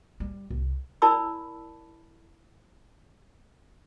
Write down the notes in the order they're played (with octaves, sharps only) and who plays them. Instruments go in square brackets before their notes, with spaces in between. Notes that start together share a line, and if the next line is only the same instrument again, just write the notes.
[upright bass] G3
C2
[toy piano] E4 A#4 D5 A5 B5 E6